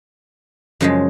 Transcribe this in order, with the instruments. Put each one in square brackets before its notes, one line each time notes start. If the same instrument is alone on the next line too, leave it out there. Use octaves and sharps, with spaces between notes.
[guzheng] F#2 C#3 F3 G#3